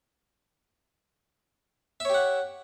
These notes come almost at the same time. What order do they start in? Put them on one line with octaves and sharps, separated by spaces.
E5 C#5 G4 F#5